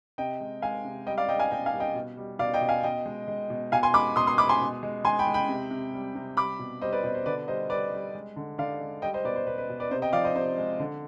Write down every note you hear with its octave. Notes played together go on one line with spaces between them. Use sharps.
C3 D#5 G5
G#3
G#3 F5 G#5
C3
G3 D#5 G5
D5 F5
G3 D#5 G5
F5 G#5
B2 D#5 G5
F5 G#5
G3
D#5 G5
B2
G3
B2 D5 F5
D#5 G5
B2
F5 G#5
B2 D#5 G5
G#3
G#3
B2
B2 F5 G#5
G#5 C6
G#3 B5 D6
B2 C6 D#6
C6 D#6
G#3 B5 D6
G#5 C6
B2
G#3
G#3 G#5 C6
G5 B5
G#3
G5 B5
C3
C3
G3
C3
G3 B5 D6
B2
G3 C5 D#5
B4 D5
B2 C5
C5
D3 B4 D5
G3 C5 D#5
G3 B4 D5
G3
G#3
D3
D3 D5 F5
G#3
G3 D#5 G5
C5 D#5
B2 B4 D5
C5
B2 B4
B4
B2
B4 D5
C3 C5 D#5
D#5 G5
F3 D5 F5
C5 D#5
C3 C5
G#3
D3